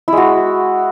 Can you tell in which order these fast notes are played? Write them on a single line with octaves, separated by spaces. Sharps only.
E4 G#3 F#4